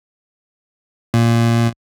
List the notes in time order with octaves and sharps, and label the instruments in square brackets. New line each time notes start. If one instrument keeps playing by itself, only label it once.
[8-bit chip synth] A#2